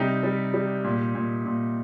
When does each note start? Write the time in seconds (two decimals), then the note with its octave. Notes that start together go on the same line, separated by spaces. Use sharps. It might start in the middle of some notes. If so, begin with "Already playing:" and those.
Already playing: C3 G3 D#4 G4
0.23 G3
0.54 G3
0.84 A#2
1.15 A#2
1.46 A#2